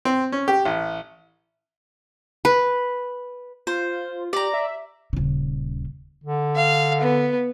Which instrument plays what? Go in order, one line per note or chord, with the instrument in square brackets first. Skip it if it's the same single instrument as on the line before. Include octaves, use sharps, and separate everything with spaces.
[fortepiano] C4
C#4
G4
A1
[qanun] B4
[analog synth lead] F4 [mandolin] C5
[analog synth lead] G4 [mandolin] D5 A#5
[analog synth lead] E5
[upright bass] D#1 C#3
[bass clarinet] D3
[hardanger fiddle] F5
B3